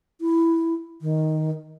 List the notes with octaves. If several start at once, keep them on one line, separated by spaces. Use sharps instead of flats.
E4
D#3